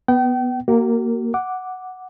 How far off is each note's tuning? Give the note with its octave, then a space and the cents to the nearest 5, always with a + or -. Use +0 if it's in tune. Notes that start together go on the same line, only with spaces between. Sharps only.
B3 +0 G5 -40
A#3 +0 F#4 +35 A#4 -20
F#5 +0 D6 +0